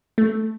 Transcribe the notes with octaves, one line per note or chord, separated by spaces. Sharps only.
A3